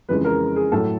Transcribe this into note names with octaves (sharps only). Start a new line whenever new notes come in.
F2 C#3 E3 G#3 B4
A#4
G#4
A2 F#3 A4